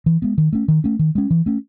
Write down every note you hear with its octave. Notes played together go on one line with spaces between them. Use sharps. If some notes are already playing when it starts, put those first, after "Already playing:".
E3
G#3 B3
D#3
A3 C#4
D#3
A3 C#4
D#3
G#3 C#4
E3
A3 C#4